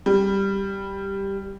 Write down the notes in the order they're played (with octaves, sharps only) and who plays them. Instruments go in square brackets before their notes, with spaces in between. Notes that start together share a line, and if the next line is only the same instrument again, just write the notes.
[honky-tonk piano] G3